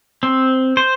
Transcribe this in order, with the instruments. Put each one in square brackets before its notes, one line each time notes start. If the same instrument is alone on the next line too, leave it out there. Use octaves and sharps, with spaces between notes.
[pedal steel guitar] C4
C5